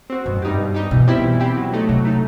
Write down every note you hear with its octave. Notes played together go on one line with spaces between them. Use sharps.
C4 F#4
G2 B2
F#2
G2 G3 D#4 G4
B2
G3 D#4 G4
B2 E3
G3 C4 E4 G4
E3
G3 C4 E4 G4
F#3
A3 D#4
C3 F#3
A3 D#4